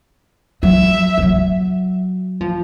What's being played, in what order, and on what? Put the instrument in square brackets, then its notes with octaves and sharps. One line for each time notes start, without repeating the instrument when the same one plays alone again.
[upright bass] F#3 [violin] E5
[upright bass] F3
F#3
F3